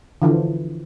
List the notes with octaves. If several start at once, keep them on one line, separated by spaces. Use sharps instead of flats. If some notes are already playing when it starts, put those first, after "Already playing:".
D3 E3 F3